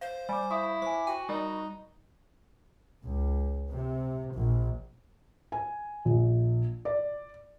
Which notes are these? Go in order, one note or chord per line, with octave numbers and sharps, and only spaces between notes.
C5 F5
G3 G#5 D6
E4 F5 C#6 D#6
C5 G#5 D6
F#4 G5 G#5
G3 D#4 A#4
C#2
C3
A#1
G#5
A#1
D5